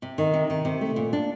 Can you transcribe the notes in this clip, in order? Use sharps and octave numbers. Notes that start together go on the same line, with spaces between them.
C3
D#3
C3
D#3
C3
A3
A#2
D4